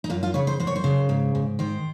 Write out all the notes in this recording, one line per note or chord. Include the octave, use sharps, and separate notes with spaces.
D#4
F#2 F4
F4
C#3 C#5
C5
F#2 C5
C#5
C5
C#3
G#2
G#2
D#3 C5